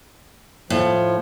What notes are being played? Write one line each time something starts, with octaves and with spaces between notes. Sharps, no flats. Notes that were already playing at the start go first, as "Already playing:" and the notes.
A2 F3